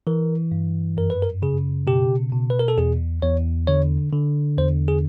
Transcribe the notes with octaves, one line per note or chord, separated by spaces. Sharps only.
E3 A#4
G2
F#2 A#4
B4
A#4
C#3 G#4
B2 G4
B2
B4
A#4
A4
E2 G#4
E2 C#5
D3 C#5
D3
E2 C5
G#4